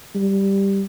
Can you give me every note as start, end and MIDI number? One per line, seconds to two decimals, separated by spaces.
0.15 0.83 55